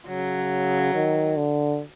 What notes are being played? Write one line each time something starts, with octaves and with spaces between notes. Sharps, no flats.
C#3 F#3
D#3
D3